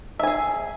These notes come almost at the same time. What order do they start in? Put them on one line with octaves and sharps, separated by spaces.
E5 G#5 G#4